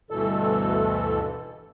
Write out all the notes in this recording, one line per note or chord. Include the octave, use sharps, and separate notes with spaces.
D2 G2 B2 E3 A4